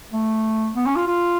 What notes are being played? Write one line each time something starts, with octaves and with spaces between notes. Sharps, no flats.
A3
B3
C#4
F4
F4